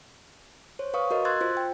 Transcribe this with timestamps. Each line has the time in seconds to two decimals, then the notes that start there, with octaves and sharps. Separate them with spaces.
0.79 C5 C#5
0.94 B4 F5 C#6 D#6
1.11 F#4 A#4 D#5
1.25 C6 E6 F#6 G#6 A6
1.41 F4 C5
1.57 G5